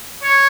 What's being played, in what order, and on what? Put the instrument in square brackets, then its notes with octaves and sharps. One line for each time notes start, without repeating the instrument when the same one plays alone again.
[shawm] C#5